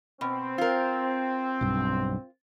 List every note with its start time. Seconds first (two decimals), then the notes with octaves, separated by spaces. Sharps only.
0.21 B2 C4
0.58 F4 A#4
1.61 B1 G2